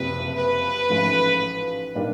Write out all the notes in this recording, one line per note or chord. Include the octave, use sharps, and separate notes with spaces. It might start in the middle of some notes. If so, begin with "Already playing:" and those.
Already playing: F#1 F2 C3 F3 B4
B4
A1 G#2 F3 A3 C#4
A#2 G3 A#3 D4